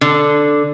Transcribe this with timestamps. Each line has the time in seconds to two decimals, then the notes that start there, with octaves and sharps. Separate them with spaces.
0.01 D3